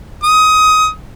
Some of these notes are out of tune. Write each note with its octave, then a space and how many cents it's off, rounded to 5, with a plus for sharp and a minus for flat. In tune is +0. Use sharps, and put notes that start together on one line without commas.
D#6 +20